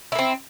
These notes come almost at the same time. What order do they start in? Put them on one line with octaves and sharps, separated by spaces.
E4 A#3 C4